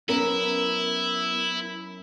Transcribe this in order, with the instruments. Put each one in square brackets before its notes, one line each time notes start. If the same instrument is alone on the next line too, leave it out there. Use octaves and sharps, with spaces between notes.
[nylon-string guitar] F#2 C#4 A#4 [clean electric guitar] B3 [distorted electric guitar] E4